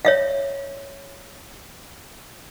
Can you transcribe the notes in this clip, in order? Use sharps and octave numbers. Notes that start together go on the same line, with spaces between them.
C#5 E5 F5